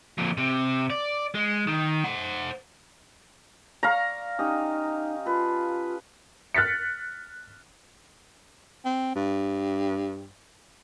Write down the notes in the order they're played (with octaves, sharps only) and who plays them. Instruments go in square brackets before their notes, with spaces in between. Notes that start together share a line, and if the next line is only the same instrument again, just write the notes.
[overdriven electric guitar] F2 A#2
C3
D5
G#3
D#3
C5 F#5
[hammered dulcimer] D5 C#6 [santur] F5 A#5
[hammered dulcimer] C#4 G4 D#5 [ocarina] D#4
[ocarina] F4 [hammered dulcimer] A4 B4
[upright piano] F6 F#6 A6 B6 C#7
[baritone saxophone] C4
G2